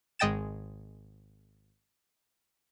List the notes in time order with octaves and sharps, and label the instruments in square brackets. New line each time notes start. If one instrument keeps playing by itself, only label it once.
[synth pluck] G#1 G#3 D#5 G5 A6 E7